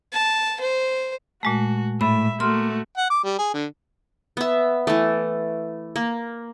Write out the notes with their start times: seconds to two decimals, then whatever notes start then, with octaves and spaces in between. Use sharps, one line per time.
0.13 A5
0.61 C5
1.43 A#2 G#3 A3 F#4
2.01 A2 A3 E5 B5
2.40 A3 A#3 F#4 C6 F6
2.97 F#5
3.10 D6
3.24 G3
3.39 G#4
3.54 D3
4.37 B3 E5
4.87 E3 A3
5.96 A#3